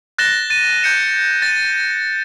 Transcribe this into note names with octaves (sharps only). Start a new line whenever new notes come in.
F#6 A6 A#6 E7 G7
A6 D#7
G6 C#7 E7
A6 D#7